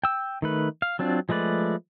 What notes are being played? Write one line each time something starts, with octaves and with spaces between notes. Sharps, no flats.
G5 E6
D#3 A3 B4
F5
F#3 C4 D4 F4
F3 G#3 A3 B4 D5